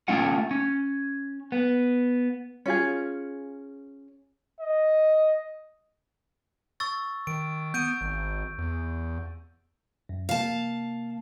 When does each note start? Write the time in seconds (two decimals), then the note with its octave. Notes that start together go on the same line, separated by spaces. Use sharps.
0.08 A3 C#4 F4 F#5
0.51 C#4
1.52 B3
2.66 C#4 F4 G#4
4.60 D#5
6.80 C#6 E6 A6
7.27 D#3 D7
7.74 B3 G6 D7 D#7
8.01 G#1
8.58 E2
10.09 F#2
10.29 C3 A#3 F5 A5